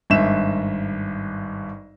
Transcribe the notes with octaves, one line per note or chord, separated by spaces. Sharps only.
G#1 G2 E5 E7